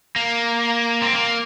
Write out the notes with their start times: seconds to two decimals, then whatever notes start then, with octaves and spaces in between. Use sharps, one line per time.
0.16 A#3
1.02 C4
1.13 A#3